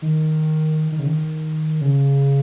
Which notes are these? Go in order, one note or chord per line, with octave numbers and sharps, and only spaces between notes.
D#3
D#3
C#3
D#3
C#3